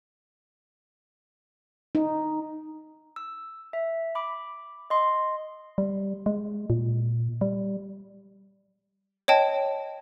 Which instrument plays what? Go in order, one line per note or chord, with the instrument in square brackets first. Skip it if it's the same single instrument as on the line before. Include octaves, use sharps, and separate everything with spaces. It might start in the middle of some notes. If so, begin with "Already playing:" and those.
[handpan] D#4
[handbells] E6
E5
B5 D6
D#5 C6
[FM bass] G3
G#3
A#2
G3
[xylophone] C#5 D#5 G5 A5